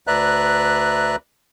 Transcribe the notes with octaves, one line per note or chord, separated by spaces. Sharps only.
D2 B4 D5 E5 A#5 F#6